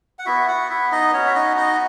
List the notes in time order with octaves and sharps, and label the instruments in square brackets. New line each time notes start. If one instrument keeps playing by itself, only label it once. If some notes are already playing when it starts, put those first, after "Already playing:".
[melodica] F#5
B3 E4 F#4 E5
F#4 F#5
E4 E5
D#4 D#5
B3 C#4 F#4 C#5
E5
D#4 D#5
D#4 D#5